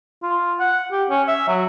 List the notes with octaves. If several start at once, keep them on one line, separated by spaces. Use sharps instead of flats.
F4
F#5
G4
C#4
E5
F#3